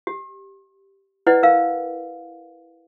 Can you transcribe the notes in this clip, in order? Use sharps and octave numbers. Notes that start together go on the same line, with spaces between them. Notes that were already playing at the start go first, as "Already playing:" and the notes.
G4
E4 B4 D5 D#5 F#5
A#4 F5